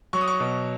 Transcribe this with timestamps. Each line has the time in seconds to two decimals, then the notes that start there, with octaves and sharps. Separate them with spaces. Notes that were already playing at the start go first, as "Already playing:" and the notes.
0.13 F#3 C#6
0.21 D#6
0.28 C#6
0.40 B2